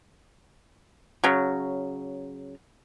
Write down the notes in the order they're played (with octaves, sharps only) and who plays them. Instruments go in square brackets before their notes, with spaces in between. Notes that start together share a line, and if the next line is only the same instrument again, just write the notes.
[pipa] C#3 F#3